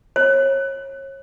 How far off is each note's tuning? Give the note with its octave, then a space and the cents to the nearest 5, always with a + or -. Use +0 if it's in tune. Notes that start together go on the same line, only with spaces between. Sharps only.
C#5 -30